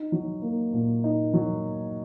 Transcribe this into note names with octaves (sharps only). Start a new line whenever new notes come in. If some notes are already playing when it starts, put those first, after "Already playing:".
Already playing: D#4
F#3
A#3
A#2
D#4
F#3